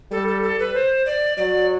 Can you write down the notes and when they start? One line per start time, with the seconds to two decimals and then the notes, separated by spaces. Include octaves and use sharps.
0.11 G3 A4
0.28 A4
0.43 A4
0.60 B4
0.74 C5
1.06 D5
1.37 F#3 D5